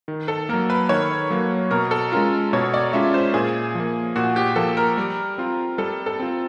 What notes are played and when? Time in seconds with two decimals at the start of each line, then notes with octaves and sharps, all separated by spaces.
0.08 D#3
0.28 A4
0.49 F#3 A#3 A#4
0.70 B4
0.89 D#3 C#5
1.30 F#3 A#3
1.71 B2 A#4
1.91 A4
2.12 G#3 C#4 F4 A#4
2.53 B2 C#5
2.74 D5
2.93 G#3 C#4 F4 E5
3.14 C5
3.34 A#2 G#4
3.75 F3 A#3
4.16 A#2 F#4
4.36 G4
4.56 F3 A#3 A4
4.77 A#4
4.97 G3
5.38 C4 F4
5.78 G3 A4
6.06 A4
6.19 C4 F4